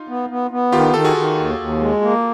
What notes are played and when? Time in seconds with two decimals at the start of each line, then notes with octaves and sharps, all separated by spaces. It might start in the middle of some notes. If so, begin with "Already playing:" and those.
Already playing: D#4 F4
0.08 B3
0.30 B3
0.51 B3
0.72 D#3 F4 G4
0.94 D#3 A4
1.04 F#4 G#4
1.16 D#3
1.37 D#2
1.58 D#2
1.80 G#3
2.02 A#3